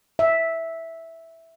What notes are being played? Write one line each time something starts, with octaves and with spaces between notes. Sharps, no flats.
E5